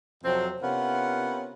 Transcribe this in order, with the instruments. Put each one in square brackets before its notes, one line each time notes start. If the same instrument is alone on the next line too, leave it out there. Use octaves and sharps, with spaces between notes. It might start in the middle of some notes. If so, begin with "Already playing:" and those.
[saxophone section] F2 C3 F#3 C4
C3 B3 C#4 F4 A#4 F#5